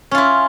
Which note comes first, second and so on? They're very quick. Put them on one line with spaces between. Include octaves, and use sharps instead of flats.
C#4 F4 E4